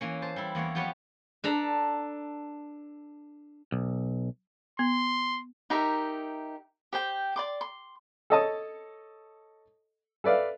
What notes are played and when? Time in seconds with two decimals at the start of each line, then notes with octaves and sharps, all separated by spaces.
0.01 E3 A#3 C#4
0.22 C5 A5
0.36 G3 E4
0.55 E2 A#3 C#5 F#5
0.75 F3 F#3 B3 G4 B4 C#5
1.44 D4 A4 A#5
3.72 B1
4.79 B3 C6
5.70 D#4 G4 A#4 E5
6.93 G4 C5 G5
7.36 D5 C6 D6
7.61 C6
8.30 A4 C#5 D#5 A5 D#6
10.24 A4 B4 D5 E5 F5